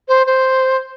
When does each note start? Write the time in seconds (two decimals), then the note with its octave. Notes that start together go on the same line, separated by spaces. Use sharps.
0.08 C5
0.27 C5